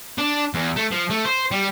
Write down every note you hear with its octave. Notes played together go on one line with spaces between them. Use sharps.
D4
E2
A3
F3
A3
C5
G3